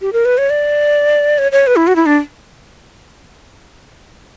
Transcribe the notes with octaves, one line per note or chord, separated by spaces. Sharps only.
G4
A#4
B4
C#5
D5
C#5
C#5
B4
E4
F#4
E4
D4